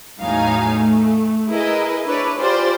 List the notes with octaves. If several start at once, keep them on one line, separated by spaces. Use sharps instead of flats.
E2 A2 F#3 D#4 F5 G#5
A3
E4 G#4 A#4 B4 D#5
D4 E4 B4 C#5 D5
F4 G4 G#4 C5 D5